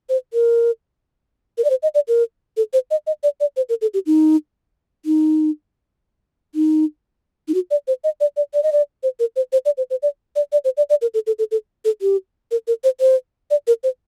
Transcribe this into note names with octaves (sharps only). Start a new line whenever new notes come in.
C5
A#4
A#4
D5
C5
D#5
D5
A#4
A4
C5
D#5
D#5
D5
D5
C5
A#4
A4
G4
D#4
D#4
D#4
D#4
F#4
D5
C5
D#5
D5
D5
D5
D#5
D5
C5
A#4
C5
C5
D5
C5
C5
D5
D5
D5
C5
D5
D5
A#4
A4
A4
A4
A4
A4
G4
A#4
A#4
C5
C5
D5
A#4
C5